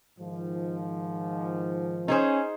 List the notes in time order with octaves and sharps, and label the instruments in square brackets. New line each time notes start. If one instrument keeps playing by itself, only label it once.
[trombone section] G#2 D#3 F3
[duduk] C#4 [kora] D#4 G#4 C5